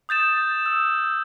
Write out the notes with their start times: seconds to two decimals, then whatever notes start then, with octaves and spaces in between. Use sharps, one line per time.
0.09 D#6 G6 A6 E7
0.66 E6